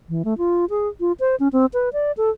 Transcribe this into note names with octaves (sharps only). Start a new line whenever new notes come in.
E3
A3
F4
G#4
F4
C5
C#4
C4
B4
D5
A4